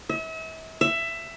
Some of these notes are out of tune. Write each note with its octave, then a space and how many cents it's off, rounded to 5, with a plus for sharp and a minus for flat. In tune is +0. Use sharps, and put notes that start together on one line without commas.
E5 -40
E5 +15